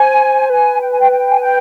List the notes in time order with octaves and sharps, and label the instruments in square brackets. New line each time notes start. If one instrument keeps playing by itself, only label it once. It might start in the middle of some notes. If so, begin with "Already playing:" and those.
Already playing: [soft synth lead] C5 [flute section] G#5
[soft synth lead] B4 [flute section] G#5
[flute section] G5
G#5
G5
G5
G#5
G5